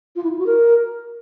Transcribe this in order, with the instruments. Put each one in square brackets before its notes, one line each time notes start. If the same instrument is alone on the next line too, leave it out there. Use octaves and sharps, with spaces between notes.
[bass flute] F4
E4
F4
F#4
A#4